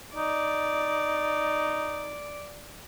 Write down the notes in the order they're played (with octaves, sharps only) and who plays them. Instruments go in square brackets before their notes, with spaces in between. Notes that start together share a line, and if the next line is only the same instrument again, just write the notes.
[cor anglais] D#4 [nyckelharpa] D5